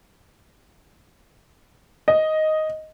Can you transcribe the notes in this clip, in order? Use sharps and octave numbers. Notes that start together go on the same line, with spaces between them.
D#5